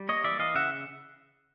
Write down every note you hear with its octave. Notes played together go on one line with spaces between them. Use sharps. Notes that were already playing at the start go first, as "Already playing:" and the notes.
Already playing: G3
A#3 C#5 D#5
E3 D5 E5
E3 D#5 F5
C#3 E5 F#5